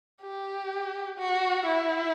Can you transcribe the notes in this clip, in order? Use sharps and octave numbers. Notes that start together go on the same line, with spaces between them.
G4
F#4
E4